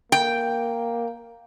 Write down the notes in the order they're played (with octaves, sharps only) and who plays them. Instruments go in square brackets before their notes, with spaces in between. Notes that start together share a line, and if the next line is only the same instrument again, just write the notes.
[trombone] A#3 [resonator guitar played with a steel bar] G5